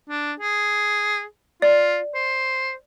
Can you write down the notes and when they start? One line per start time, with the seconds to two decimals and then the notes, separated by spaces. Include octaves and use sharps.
0.09 D4
0.40 G#4
1.62 F4 D5
2.15 C5